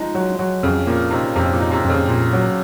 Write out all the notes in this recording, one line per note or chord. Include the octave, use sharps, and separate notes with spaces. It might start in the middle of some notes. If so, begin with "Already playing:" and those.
Already playing: F3 G#3 D#4
F#3
F#3
F2 C#3
A#2 A#3
C3 D#4
F2 C3
A#2
D#4
C3
F2
C#3
A#2
F#3